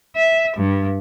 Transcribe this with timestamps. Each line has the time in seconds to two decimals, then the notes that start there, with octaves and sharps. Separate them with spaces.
0.16 E5
0.57 G2